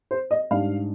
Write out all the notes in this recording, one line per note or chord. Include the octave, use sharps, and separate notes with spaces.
C5
D#5
G#2 G3 D4 F5